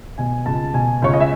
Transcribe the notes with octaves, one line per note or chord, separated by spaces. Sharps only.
B2 G#5
C#2 A5
B2 G#5
C#2 C#5
D#5
E5